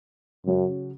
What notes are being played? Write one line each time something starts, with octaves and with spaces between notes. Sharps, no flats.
F#2 C#3 F#3 C#4 F#4